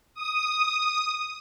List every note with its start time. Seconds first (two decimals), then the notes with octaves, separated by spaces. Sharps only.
0.14 D#6